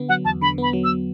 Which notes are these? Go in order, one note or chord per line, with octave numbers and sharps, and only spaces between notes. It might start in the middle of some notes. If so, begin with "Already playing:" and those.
Already playing: D3 B3
F#3 F#5
E2 A5
D3 B5
B3 B5
F#3
E6